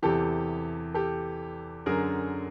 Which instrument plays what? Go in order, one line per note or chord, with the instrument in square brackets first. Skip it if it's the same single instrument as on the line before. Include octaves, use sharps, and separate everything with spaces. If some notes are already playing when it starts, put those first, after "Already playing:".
[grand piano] E2 C3 E3 G4 A4
G4 A4
F#2 D3 G#4 A#4